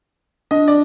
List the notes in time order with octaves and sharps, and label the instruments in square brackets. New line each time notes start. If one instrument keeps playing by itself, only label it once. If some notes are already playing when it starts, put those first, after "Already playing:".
[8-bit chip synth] D4 [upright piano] D#5
[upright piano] D5